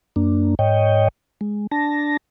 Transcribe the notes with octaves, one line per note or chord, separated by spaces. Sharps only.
F#2 A#3 D4
G#2 C#5 D#5 G5
G#3
D4 A5 A#6